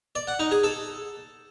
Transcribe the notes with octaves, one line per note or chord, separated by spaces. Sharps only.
D5
F#5
D#4
G#4
A4